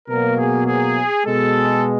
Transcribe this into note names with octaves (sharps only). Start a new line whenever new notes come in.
B2 F#3 A#3 A#4
G#4
G#4
B2 G#3 A4